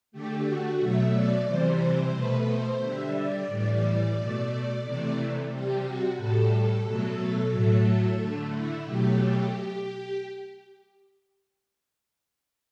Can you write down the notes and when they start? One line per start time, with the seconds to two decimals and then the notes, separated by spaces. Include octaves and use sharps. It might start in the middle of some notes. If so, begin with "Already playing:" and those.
0.12 D3 A3 G4
0.45 F#4
0.79 B2 F#3 A3 E5
1.13 D5
1.46 C3 E3 G3 C5
2.13 B2 A3 B4
2.47 C5
2.80 D3 G3 E5
3.14 D5
3.48 A2 E3 G3
4.15 B2 A3
4.82 C3 E3 A3 D5
5.49 C3 G3 G4
5.83 F#4
6.17 A2 G3 A4
6.84 B2 F#3 A3
7.51 A2 F#3 A3
8.19 D3 A3
8.52 E4
8.85 B2 F#3 A3 G4